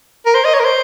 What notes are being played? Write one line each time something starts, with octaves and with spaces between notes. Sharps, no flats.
A#4
C5
D#5
C#5
A#4
C5